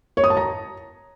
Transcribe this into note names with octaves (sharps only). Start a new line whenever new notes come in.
C#5
D#6
A5
A#5